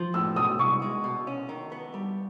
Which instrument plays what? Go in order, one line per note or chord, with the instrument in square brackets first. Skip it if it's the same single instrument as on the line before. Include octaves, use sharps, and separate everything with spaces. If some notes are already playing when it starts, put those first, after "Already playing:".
Already playing: [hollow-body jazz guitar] F3
[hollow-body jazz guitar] A2 [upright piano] E6
[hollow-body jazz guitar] B1 [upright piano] D#6
[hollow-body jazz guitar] C2 [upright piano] C#6
[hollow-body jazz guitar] G#3
B2
C#4
D#3
B3
G3